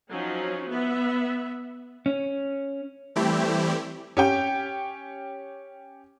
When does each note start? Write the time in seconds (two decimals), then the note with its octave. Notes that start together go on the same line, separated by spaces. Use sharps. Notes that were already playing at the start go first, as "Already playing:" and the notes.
0.11 F3 F#3 C#4 D#4
0.69 B3 E5
2.06 C#4
3.16 E3 G3 A3 C4 E4 G4
4.17 C#4 G4 G5